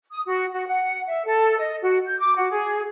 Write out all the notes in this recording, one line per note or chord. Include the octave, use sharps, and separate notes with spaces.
D#6
F#4
F#4
F#5
E5
A4
D#5
F#4
G6
D6
F#4
G#4